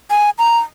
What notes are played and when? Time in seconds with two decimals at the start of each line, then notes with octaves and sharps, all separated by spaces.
0.10 G#5
0.39 A#5